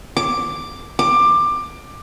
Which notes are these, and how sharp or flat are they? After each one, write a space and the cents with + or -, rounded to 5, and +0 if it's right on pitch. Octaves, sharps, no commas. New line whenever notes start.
D6 +5
D6 +20